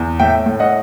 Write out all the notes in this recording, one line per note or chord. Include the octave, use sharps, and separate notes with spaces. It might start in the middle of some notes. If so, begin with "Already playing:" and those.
Already playing: E2
A2 E5 G5
A2
D#5 F#5